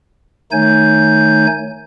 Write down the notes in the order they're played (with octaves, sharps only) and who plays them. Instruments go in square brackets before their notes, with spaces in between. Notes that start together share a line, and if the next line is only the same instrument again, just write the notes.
[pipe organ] D#3 A3 D#4 C#5 G#5 G6